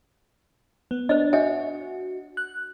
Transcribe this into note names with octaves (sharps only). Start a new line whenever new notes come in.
B3
D4 C5 D#5
D4 F#4 D#5 E5
F#6